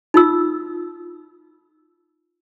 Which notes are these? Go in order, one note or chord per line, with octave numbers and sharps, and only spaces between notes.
D#4 F4 E6